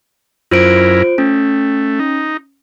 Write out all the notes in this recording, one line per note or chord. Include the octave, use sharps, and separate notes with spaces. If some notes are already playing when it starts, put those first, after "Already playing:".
F#2 E4 F4 A#4 C5 D7
A3 C#4
D#4